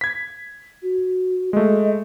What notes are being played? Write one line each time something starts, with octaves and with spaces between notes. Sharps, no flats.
G#6 B6
F#4
G#3 A3 D#5